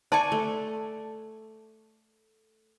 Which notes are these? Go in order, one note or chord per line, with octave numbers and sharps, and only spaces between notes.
C5 D5 G#5 A5 C6 C#6
A3